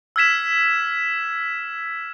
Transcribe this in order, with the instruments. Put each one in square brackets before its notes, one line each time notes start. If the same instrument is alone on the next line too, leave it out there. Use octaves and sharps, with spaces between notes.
[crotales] E6 F6 G#6 B6 E7